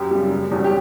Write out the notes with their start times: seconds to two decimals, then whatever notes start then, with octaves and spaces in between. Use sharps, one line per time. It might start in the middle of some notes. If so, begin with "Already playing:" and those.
Already playing: F#2 G4
0.11 C#3 G3
0.31 E1
0.51 E2 B2 G3 C#4
0.64 G4